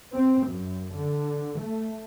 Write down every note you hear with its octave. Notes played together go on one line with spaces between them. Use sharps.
C4
F#2
D3
A3